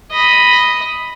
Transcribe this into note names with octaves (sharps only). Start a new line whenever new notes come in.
D#5 B5